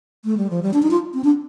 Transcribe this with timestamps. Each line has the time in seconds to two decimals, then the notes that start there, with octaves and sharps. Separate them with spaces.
0.25 A3
0.37 G3
0.50 F3
0.63 G3
0.74 D4
0.82 D#4
0.91 F4
1.14 C4
1.24 D4